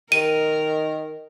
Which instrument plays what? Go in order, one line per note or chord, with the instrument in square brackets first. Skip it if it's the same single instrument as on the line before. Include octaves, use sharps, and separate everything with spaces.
[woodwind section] D#3 [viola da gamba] A#4 [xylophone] D#7